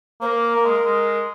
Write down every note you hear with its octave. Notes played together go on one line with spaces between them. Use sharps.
A#3 A#4 C5
A#3
G#3
G#3